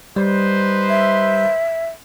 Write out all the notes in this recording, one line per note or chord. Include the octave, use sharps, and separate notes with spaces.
G3 D#4 B4 C5
E5